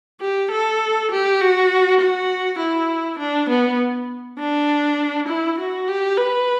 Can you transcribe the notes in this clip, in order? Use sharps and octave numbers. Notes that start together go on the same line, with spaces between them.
G4
A4
G4
F#4
F#4
E4
D4
B3
D4
E4
F#4
G4
B4